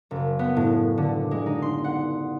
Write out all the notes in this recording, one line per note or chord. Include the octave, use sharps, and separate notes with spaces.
F#1
B3
A2
D3
G#3
D#4
C6
F#5